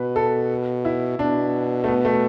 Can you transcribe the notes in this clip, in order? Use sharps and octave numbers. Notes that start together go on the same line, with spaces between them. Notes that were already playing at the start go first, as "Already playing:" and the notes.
Already playing: B2 B4
A4
E4
B2 D4
A3
B3
A3